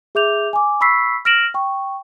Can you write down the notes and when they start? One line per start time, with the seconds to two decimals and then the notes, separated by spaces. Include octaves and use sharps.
0.15 G#4 E5 D6 G6 F7
0.53 G#5 D6
0.81 B5 C#6 E6 B6 C7
1.25 F6 A#6 D7 E7 F#7
1.54 G5 C#6